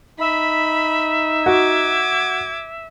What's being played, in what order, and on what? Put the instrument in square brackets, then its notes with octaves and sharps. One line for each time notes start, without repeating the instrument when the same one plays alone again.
[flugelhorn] D#4 [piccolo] E5 [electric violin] B5
[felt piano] F#4 [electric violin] D6 G#6